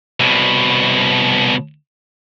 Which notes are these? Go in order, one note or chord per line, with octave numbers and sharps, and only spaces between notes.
C2 B2